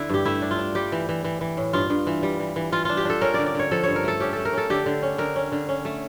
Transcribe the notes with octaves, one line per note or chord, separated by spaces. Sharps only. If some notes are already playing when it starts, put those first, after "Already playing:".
Already playing: D3 E4
G2 G4
A3 E4
D4
F4
D4
G3 G4
E3
E3
E3
E3
A2
G2 F4
G2
E3
G3
E3
E3
E3 F4
D4 F4
G4
D4 A4
C#4 A#4
D3 D5
D5
D3 C#5
F3 A4
G2 C#5
A#4
A3 A4
C#4 G4
A3 A4
A#4
C#4 A4
D3 G4
D3
C#4
D3 A#4
C#4
D3
C#4
A3